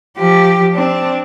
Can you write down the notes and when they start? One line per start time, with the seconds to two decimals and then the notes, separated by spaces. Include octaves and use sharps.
0.17 F3 G4
0.74 C4 D4